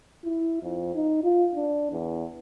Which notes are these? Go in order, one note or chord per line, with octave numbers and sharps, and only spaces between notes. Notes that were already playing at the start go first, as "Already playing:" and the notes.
E4
F2
D#4
F4
D4
E2